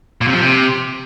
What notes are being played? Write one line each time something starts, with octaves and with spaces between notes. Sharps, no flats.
A#2
C3
F3
C3